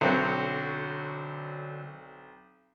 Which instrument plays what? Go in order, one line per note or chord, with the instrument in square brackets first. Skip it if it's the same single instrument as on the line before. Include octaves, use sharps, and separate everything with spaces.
[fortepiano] B1 C4 [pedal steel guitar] D3 F#3 F#4